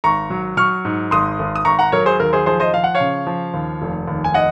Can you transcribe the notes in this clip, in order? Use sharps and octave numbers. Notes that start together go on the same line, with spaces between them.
G#1 A#5 C#6
F#3
F#3 C#6 F6
G#2
G#1 C6 D#6
G#1
D#6
G#1 A#5 C#6
F#5 A#5
F#3 A#4 C#5
G#4 C5
D#2 A#4
G#4 C5
F3 G#4 C5
C5 D#5
F3 F5
F#5
C#5 F5
C#3
F3
D#2
F1
D#2
G#5
D#5 F#5